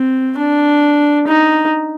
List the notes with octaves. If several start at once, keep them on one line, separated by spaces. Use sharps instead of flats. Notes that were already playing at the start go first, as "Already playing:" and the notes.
Already playing: C4
D4
D#4